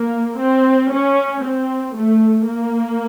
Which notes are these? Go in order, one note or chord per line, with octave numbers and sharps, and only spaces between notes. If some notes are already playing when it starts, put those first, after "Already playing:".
Already playing: A#3
C4
C#4
C4
A3
A#3